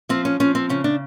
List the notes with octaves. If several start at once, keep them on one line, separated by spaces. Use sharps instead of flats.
F3 C4
C#4
F3 C#4
C4
C#3 C#4
D4